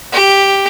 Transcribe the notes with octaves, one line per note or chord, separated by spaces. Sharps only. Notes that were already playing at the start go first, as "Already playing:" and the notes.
G4